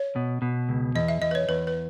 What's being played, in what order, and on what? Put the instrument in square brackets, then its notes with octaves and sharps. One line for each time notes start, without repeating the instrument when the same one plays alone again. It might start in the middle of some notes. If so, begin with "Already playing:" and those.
Already playing: [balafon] C#5
[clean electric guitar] B2
B2
C#2
[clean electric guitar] E2 [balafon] D#5
[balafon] E5
[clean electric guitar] E2 [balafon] D#5
[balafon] B4
C#5
[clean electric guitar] E2 [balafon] B4
[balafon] B4